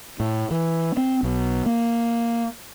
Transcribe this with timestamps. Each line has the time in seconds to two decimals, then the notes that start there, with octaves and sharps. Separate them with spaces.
0.20 A2
0.51 E3
0.97 C4
1.23 B1
1.66 A#3